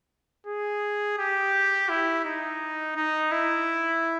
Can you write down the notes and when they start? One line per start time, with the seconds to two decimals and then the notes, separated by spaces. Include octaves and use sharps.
0.47 G#4
1.18 G4
1.89 E4
2.24 D#4
2.96 D#4
3.31 E4